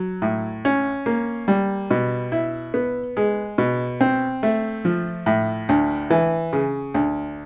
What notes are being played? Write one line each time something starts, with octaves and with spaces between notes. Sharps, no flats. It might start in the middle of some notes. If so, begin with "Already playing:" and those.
Already playing: F#3
A2
C#4
A#3
G3
B2
E4
B3
G#3
B2
C4
A3
F3
A2
D2
E3
C#3
D2